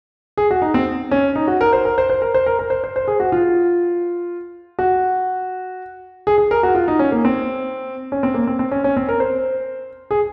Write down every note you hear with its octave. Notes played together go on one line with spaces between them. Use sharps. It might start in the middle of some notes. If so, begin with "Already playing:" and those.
G#4
F#4
D#4
C4
C#4
D#4
F#4
A#4
C5
A#4
C5
C5
A#4
C5
A#4
A#4
C5
C5
C5
G#4
F#4
F4
F#4
G#4
G#4
A#4
F#4
F4
D#4
C#4
A#3
C4
C#4
C4
A#3
C4
C4
C#4
C#4
C4
A#4
C5
G#4